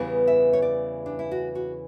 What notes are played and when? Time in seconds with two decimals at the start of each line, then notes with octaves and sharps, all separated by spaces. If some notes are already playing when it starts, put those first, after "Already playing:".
Already playing: E2 C#3 E3 G3 B3
0.27 E5
0.53 C#5
0.62 D5
1.06 D4
1.19 E4
1.31 F#4
1.55 F#4